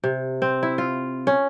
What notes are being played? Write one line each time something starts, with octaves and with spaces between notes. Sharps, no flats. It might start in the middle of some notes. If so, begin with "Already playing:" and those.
C3
C4
E4
F4
C#4